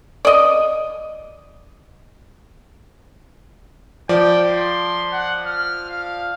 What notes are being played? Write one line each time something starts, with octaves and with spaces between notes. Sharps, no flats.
D5 D#5
F3 D5 G5
C6
F#5
F6
F5